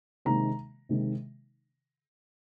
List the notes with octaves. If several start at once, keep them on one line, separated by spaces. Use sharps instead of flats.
C3 D#3 G#3 D#4 A#5
C3 D#3 G#3 D#4